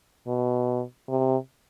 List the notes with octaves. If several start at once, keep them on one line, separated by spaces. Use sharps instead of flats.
B2
C3